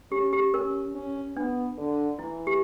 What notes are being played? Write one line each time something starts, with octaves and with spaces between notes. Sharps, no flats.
C#4 G4
G4
C#4 A#4
C#4
B3 D4
D3
E3 E4
G4